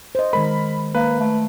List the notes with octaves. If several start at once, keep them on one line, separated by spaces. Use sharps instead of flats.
C5 D#5
D#3 G#3 A#4 B5
A#3 B4
A3